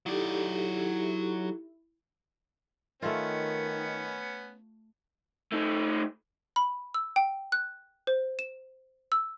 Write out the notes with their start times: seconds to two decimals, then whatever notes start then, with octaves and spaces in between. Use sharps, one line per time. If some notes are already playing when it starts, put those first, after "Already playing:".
0.06 F#3 D#4 E4 G4 A4 D5
3.02 D#3 A3 B3 C#4 F4
5.52 A3 D#4
6.56 B5
6.94 E6
7.16 G5
7.52 F#6
8.07 C5
8.39 E7
9.12 E6